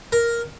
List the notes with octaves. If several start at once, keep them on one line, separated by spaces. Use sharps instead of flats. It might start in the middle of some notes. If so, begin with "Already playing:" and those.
A#4